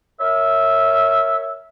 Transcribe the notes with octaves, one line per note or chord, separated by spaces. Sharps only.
A#4 C#5 E5